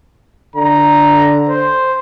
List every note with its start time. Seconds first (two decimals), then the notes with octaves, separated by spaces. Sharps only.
0.56 D3 A#5
1.49 C5